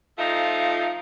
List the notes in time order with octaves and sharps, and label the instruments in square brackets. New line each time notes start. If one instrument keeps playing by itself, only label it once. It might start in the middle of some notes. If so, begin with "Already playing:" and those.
[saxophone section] F3 A3 D#4 F4